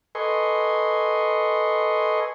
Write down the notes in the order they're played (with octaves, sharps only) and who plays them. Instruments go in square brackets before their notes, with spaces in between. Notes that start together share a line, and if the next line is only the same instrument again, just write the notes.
[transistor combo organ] A4 B4 D#5 G#5 C6 C#6